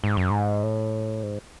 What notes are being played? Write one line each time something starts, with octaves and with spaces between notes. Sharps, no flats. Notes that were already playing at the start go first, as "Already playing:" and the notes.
G#2
F#2
G#2
A2
G#2